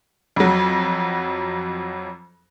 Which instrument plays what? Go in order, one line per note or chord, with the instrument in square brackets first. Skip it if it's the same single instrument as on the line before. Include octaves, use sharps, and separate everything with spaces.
[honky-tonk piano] F2 F#3